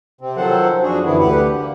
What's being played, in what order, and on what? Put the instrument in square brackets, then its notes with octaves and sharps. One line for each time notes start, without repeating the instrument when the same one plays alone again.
[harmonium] C3 C4
D#3 F3 F#3 A4 C5 F#5
F2 D4 F#4 G#4
F#2 D3 E3 B3 E4
D2 D3 G4 B4 F#5
A#3